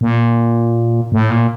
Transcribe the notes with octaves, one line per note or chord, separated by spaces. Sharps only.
A#2
A2
A#2